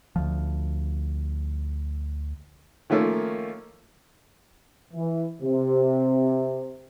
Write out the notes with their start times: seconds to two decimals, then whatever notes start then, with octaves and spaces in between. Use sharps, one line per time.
0.16 D2 F3
2.90 D#3 F3 A3 A#3 C#4
4.94 E3
5.42 C3